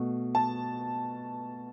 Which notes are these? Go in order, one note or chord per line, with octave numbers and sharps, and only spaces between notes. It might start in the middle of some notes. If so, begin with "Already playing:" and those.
Already playing: B2 A3
A5